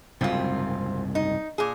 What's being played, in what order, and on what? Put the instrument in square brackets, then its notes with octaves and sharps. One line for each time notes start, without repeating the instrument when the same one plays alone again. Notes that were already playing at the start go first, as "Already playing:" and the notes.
[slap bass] F#1 C2 G#2 [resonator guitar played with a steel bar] C4 F4
[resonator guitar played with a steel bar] D#4
A#2 G#4